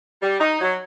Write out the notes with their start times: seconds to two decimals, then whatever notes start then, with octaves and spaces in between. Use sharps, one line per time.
0.22 G3
0.40 D#4
0.60 F#3